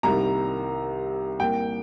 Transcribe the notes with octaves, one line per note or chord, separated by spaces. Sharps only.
C2 C3 D#3 G3 A#3 A#5
C2 A#2 A#3 G5